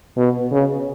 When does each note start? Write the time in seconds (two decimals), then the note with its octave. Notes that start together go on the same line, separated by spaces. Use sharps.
0.17 B2
0.52 C#3